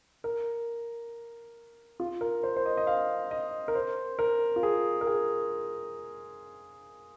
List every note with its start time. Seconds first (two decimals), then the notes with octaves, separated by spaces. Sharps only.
0.24 A#4
2.00 F4
2.21 A#4
2.43 C5
2.56 C5
2.66 D#5
2.77 D#5
2.87 F5
3.31 D#5
3.68 A#4
3.75 C5
4.19 A#4
4.56 F4
4.63 G#4
5.01 A#4
5.07 G#4